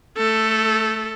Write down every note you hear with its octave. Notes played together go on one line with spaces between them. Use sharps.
A3 A4